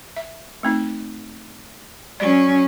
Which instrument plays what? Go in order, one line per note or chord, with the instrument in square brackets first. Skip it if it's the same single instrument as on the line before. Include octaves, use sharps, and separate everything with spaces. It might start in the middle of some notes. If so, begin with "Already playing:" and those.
[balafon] E5
A3 C4 D#4
[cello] F#3 C#4 [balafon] D5